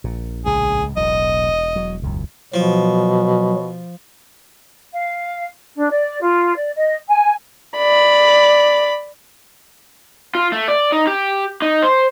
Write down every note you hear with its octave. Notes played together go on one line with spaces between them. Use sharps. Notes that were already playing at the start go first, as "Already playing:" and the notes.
A#1 A#2
C#2 A2 G#4
E1 B1 A2 D#5
F#3
C#2 F#2
B2 F3 F#3
F5
D4
D5
F4
D5
D#5
G#5
D5 B5
F4
A3
D5
D#4
G4
D#4
C5